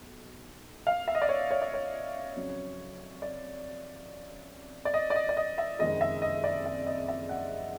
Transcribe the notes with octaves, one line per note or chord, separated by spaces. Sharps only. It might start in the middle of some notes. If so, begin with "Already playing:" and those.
Already playing: B1
F5
E5
D#5
D5
C#5
C#5
D5
C#5
F2 C#3 F#3
D5
D5
D#5
D5
D#5
D5
D#5
E5
F#1 F2 C3 D#3 G#3 D#5
E5
D#5
D5
E5
D#5
E5
F#5